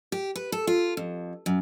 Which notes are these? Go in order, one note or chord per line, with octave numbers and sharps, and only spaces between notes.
G4
B4
A4
F4
F2
F#2